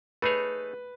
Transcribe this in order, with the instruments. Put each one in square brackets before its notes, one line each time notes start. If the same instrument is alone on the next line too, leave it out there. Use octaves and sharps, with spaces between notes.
[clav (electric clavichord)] A3 D#4 G#4 C#5 [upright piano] B4